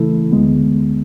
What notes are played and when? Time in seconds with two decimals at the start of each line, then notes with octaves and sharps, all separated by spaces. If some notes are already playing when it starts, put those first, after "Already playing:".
Already playing: C#3 E3 A3 E4 A4
0.31 D2 D3 G#3 B3